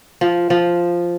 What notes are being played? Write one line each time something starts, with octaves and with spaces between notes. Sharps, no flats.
F3
F3